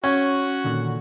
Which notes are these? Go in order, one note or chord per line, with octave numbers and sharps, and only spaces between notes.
C#4 F#4
A#2 D3 D#3